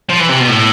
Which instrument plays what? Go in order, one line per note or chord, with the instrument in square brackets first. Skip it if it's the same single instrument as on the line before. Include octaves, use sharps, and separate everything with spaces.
[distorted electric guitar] F3
E3
C3
B2
A2